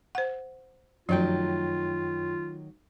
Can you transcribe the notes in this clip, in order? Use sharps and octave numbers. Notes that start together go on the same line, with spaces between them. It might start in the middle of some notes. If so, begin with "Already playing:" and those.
C5 F#5
F#2 D#3 F3 F#3 A3 F4 C#5 G5